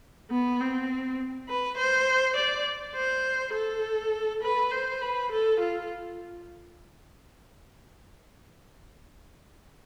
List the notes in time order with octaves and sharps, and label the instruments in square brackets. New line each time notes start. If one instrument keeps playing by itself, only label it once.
[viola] B3
C4
B4
C5
D5
C5
A4
B4
C5
B4
A4
F4